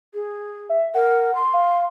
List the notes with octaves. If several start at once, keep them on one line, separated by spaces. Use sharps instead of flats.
G#4
E5
A#4 F#5
C6
F5